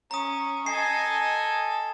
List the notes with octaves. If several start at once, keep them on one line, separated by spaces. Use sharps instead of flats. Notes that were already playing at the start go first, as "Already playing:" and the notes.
C#4 A#5 D#6
A4 D#5 G#5 C7